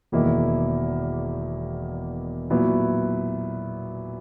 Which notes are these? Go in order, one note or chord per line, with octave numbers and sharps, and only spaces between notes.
E1 E2 D#3 A#3 E4
A#2 F#3 B3 E4